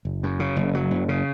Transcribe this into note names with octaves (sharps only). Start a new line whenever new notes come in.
F#1
F#2
C#3
F#1
F#3
F#1
C#3